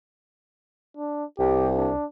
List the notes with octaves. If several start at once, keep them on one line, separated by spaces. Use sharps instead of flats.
D4
C2 G4
D4